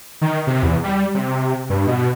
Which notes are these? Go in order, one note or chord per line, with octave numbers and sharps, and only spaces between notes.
D#3
C3
E2
G3
C3
G2
B2